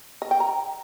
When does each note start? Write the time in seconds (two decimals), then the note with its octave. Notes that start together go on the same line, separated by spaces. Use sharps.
0.22 D#5
0.31 G5
0.40 A#5